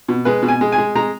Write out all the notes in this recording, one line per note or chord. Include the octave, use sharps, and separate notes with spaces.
B2
G#3 B4
B2
G#5
G#3
G#5
G#3
G#3 A#5